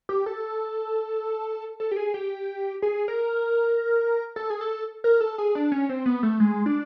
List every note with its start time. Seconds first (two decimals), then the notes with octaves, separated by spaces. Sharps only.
0.09 G4
0.26 A4
1.80 A4
1.91 G4
1.96 G#4
2.14 G4
2.82 G#4
3.08 A#4
4.36 A4
4.50 G#4
4.61 A4
5.04 A#4
5.21 A4
5.38 G#4
5.55 D4
5.72 C#4
5.89 C4
6.06 B3
6.23 A3
6.40 G#3
6.66 D4